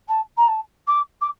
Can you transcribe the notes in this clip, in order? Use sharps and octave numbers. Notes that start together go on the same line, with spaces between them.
A5
A#5
A5
D6
D6